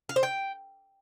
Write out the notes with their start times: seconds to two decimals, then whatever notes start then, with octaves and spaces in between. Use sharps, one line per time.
0.09 F5
0.16 C5
0.23 G5